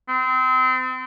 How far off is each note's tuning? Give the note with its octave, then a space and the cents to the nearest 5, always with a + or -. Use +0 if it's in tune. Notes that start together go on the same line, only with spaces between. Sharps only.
C4 -30